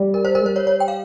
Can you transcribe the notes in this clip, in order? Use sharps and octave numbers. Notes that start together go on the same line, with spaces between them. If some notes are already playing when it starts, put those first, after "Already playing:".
Already playing: G3
A#4
C5
A#4
G#3
G3 C5
C#5
C#5
G5
F5